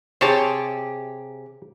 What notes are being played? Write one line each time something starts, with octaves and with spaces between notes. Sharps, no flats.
C3 G4 G#4 C5 C#5 A5